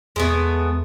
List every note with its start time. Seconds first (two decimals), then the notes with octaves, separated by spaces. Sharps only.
0.16 E2 G#3 A3 B3